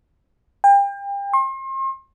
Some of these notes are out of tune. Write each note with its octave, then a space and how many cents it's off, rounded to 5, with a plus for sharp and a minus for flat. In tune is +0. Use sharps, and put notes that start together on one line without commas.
G5 +35
C6 +40